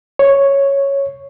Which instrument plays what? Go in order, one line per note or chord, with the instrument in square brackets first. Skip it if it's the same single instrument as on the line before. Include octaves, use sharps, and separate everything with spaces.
[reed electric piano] C#5